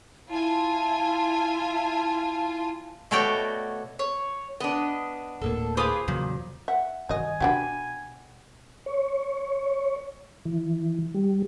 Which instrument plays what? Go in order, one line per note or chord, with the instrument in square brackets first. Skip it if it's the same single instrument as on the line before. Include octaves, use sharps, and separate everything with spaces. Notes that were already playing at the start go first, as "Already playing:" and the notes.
[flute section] E4 A5 [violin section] F4 G#5
[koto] B2 A3 F#4 C#5 D5 G5
[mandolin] C#5
[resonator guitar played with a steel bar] B3 D4 [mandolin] D#5
[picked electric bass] D1 A2 A#3 [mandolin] A4
[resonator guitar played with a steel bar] F4 G#4 B4 [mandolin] C5 D6 D#6
[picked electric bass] E2 C#3 F#3 [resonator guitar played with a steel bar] A#2
[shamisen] E5 [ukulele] F#5
[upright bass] G2 D#3 [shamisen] F#4 D#5 [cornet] G#5
[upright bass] B2 [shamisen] D4 F#4 G4 [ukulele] F#5 G5 B5
[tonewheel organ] C#5
E3
G3